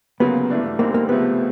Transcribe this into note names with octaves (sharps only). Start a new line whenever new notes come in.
D2 C#3 F#3 A#3 B3
G2 E3 A3 D4
D2 D3 G3 A#3 C4 D#4
A#3
C#2 C3 F3 A3 B3